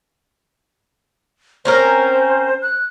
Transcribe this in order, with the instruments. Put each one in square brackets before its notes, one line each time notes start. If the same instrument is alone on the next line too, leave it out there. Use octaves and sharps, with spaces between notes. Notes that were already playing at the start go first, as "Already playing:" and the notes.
[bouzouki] C4 C#4 A#4 [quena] C5
[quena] F#6